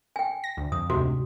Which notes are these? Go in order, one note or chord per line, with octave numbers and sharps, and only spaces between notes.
G5 G#5
A#6
D2
F2 D#6
D2 G#2 C3 F#4